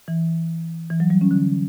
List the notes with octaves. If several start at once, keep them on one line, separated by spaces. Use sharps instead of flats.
E3
E3
F#3
G3
C#4
D3